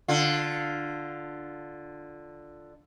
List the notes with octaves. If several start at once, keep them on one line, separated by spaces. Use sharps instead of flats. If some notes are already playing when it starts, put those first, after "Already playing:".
D3 F4